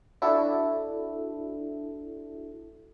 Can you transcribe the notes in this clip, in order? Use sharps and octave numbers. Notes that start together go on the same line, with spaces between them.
D4 E4 F#4 A4